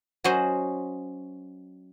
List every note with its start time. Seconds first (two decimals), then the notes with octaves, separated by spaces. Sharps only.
0.24 F#3 C#4 F#4 C5 D#5